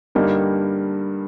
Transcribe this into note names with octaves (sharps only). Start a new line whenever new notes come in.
G2 D3 G3 A#3 D#4